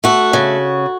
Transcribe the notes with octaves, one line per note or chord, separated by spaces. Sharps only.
A3 F#4
C#3